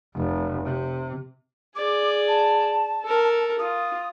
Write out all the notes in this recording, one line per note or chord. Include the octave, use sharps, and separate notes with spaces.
F1
C3
G#4 D5 D6
A5
A4 A#4
F4 D#6